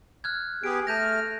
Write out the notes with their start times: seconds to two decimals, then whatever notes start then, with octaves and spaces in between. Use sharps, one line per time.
0.24 F6 F#6 G#6
0.64 B3 G4 G#4 D7
0.87 A3 A5 F6 G6 A#6